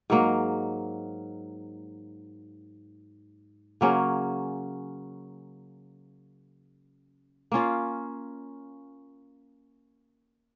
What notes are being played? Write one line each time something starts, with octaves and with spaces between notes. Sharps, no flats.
G#2 F#3 A#3
C#3 F#3 A#3 C#4
A#3 C#4 F4